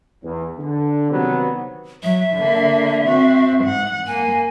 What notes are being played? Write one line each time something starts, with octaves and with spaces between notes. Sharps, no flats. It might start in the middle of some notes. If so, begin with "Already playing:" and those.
E2
D3
C3 D#3 F#3 G3 B3
F#3 E5
D3 A#3
C4 F#4
G#2 F#5
A#3 G#5